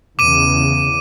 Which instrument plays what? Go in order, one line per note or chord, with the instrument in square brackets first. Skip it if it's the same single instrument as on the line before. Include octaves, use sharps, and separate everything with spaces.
[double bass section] E2 C#3 [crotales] D6 D#7